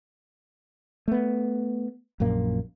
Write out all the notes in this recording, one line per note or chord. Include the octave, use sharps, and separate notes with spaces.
A3 B3
A#1 F#2 A#2 A#3